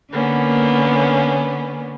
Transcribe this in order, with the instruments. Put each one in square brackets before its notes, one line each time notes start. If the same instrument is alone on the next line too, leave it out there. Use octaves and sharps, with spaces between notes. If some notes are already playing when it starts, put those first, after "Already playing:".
[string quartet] D3 A#3 B3 C#4